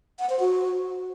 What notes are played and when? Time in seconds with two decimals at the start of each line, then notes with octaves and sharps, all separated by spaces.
0.19 F#5
0.30 C5
0.40 F#4